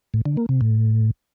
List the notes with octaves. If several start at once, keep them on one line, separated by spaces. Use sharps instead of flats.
A2
D3
A#3
C3
A2